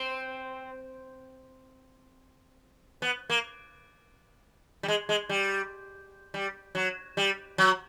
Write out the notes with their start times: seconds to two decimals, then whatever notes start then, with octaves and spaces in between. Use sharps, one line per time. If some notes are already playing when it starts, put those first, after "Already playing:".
Already playing: C4
3.02 B3
3.30 A#3
4.83 G3
4.88 G#3
5.09 G#3
5.29 G3
6.34 G3
6.75 F#3
7.17 G3
7.58 F#3